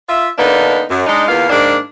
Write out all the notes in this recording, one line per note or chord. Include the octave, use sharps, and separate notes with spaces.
F4 E5
D3 A#3 B3 D4 D#4
F#2
G#3 D4 D#4
E2 A#3 B3 F4 F5
G#2 D#3 A#3 D4